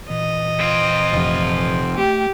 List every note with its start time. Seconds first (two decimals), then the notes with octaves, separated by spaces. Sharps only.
0.10 A#2 E3 D#5
0.60 C4 F4
1.13 F1 F2
1.97 A3 G4 G5